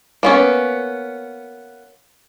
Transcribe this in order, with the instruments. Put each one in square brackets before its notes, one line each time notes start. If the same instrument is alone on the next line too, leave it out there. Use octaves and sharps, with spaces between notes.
[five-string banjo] A#3 B3 C#4